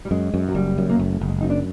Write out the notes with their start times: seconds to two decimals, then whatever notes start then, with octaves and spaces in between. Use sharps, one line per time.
0.05 G3
0.11 F#2 G#3
0.34 F#2
0.48 F#3
0.55 F#1 G3
0.78 F#2
0.89 A#3
0.99 F#1 A3
1.21 F#1
1.28 G#3
1.41 F#2 D#4
1.50 D4